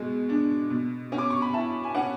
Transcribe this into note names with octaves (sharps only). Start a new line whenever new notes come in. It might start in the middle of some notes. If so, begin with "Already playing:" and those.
Already playing: B2 G#3
D4
B2
C#4
D6
C#6
B5
E4 A5
G#5
C#4 F#5